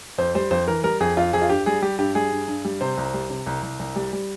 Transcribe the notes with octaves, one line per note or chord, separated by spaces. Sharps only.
F2 C5
G3 C5
F2 C5
E3 A#4
G3 A#4
F2 G#4
F2 F4
F2 G#4
F4
G2 G4
G3 G#4
G3 G4
G2 G4
G3 G#4
G2
G2
G3
C3 C5
C2
G3
C3
C2
C2
C2
G3
G3